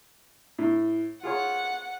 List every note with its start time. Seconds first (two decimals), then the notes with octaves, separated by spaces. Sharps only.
0.59 A2
1.23 F4 G#4 C#5 F#5